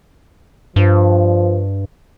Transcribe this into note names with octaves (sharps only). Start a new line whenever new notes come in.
G2 F3